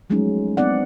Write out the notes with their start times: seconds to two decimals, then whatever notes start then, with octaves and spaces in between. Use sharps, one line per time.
0.10 F3 F#3 G#3 A3 C#4 D#4
0.57 B3 C4 D#4 D5 F#5